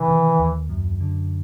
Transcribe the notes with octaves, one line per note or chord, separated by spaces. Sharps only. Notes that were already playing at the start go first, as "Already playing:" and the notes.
Already playing: C3 E3
D#3
D#2
F#2
D3